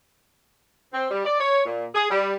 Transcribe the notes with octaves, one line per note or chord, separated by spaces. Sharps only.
C4
G3
D5
C#5
A#2
G#4
G3